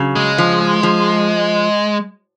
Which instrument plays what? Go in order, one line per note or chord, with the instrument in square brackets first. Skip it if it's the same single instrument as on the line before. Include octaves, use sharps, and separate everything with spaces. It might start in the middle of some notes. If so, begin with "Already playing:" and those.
Already playing: [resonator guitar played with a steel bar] C#3 F#3
[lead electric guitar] G#3
[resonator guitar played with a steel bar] F3
F3